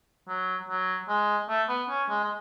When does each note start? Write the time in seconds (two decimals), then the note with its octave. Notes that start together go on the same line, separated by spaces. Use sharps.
0.28 F#3
0.69 F#3
1.08 G#3
1.49 A3
1.69 B3
1.89 C#4
2.09 G#3
2.24 G#3